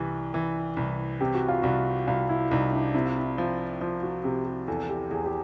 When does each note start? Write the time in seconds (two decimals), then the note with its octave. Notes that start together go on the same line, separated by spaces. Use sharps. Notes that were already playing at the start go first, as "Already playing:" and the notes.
Already playing: C2 E3 G4
0.34 E3
0.77 C2
1.21 C3 G4
1.34 F#4
1.48 F4
1.62 C2 F#4
2.07 C2 F4
2.29 E4
2.51 C2 D#4
2.73 D4
2.94 C3 E4
3.05 F4
3.17 E4
3.38 F3
3.81 F3 F4
4.02 F#4
4.24 C3 G4
4.46 G4
4.68 E2 A4
4.89 G4
5.11 E2 G#4
5.26 G4